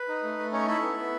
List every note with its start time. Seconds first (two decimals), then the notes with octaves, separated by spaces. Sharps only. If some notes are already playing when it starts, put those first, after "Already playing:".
Already playing: B4
0.08 D#4
0.23 A3
0.38 A3
0.52 C#4 D#4 C#5
0.67 E4 A4 E5
0.82 B3
0.98 B3